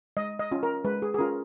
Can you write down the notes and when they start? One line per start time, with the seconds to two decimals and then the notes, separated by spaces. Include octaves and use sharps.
0.17 G#3 D#5
0.39 D#5
0.51 C#4 F4
0.63 A#4
0.85 G#3 B4
1.02 G#4
1.14 G#4
1.18 C#4 F4 A#4